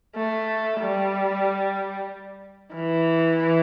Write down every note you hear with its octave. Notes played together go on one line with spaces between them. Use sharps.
A3
G3
E3